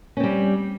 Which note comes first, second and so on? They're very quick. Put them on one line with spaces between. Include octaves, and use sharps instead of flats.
C#4 C4 G3